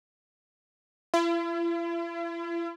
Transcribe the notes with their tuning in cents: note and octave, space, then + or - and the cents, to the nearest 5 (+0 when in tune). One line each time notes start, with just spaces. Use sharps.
E4 +45